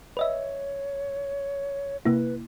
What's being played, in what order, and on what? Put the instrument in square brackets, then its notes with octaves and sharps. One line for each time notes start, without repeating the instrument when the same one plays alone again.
[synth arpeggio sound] B4 D#5 E5 [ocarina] C#5
[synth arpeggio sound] C3 A#3 E4 [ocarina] B4